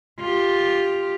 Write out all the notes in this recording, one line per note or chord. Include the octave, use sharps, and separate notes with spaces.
F4 G4